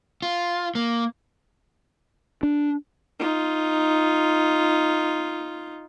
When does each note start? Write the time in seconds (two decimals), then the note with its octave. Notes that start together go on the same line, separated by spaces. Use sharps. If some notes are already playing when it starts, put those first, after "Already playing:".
0.22 F4
0.75 A#3
2.43 D4
3.19 D#4 F4